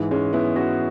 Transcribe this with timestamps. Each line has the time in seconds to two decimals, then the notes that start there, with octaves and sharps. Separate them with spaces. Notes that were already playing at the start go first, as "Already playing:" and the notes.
Already playing: G#2 E3 G#3
0.11 G#3 C#4
0.33 B3 E4
0.56 C#4 F#4